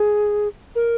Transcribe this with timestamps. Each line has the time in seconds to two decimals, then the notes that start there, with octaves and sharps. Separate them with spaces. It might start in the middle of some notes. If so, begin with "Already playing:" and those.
Already playing: G#4
0.75 A#4